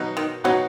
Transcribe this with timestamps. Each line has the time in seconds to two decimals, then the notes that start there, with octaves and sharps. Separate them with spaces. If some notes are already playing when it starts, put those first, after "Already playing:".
Already playing: B2 F#3 B3 D#4
0.17 D#3
0.44 B2 F#3 B3 D#4